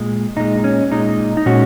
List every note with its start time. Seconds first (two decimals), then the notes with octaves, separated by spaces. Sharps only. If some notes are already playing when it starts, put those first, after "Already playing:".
Already playing: A#2 G#3
0.36 A#2 G#3 D#4
0.64 C#4
0.91 A#2 G#3 D#4
1.37 D#4
1.46 A#2 G#3 C#4 F#4